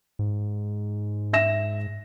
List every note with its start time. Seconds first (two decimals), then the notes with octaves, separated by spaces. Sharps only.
0.19 G#2
1.33 E5 A#6 E7